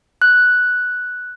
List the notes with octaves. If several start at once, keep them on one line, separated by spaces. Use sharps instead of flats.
F#6